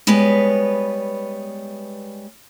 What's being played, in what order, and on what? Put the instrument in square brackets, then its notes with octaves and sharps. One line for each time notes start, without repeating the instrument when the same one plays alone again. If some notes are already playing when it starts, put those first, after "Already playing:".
[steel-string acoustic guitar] G3 G#3 B3 B4 C#5